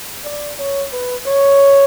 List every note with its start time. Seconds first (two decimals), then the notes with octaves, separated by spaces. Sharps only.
0.25 D5
0.59 C#5
0.92 B4
1.27 C#5